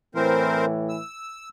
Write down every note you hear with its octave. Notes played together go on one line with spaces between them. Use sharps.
A2 E3 C4 A#4 C5
E6